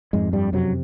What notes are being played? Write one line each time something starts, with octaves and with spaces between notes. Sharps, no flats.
F2 G#2 G#3
G2 G3
F#2 C3 F#3